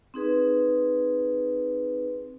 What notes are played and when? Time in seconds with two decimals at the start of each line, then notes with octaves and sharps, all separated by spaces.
0.14 C4 D#4 G#4 B4